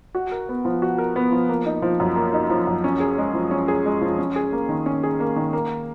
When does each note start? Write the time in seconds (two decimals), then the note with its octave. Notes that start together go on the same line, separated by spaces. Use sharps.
0.15 F#4
0.32 A#4
0.49 B3
0.65 F3
0.82 F#4
0.98 A#4
1.16 B3
1.32 F3
1.49 A#3
1.66 D#4
1.82 F3
2.00 F#2
2.16 A#3
2.33 D#4
2.50 F3
2.67 F#2
2.84 C#4
3.00 G#4
3.18 G#3
3.34 F3
3.51 C#4
3.68 G#4
3.85 G#3
4.01 F3
4.18 C#4
4.36 G#4
4.52 A#3
4.69 D#3
4.86 C#4
5.03 G#4
5.20 A#3
5.36 D#3
5.53 A#3